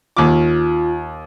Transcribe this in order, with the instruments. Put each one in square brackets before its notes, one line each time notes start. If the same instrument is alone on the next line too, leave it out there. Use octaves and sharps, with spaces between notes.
[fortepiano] D#2 D6 [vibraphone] F4